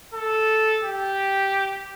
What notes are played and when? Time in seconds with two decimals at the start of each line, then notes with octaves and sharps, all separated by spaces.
0.14 A4
0.84 G4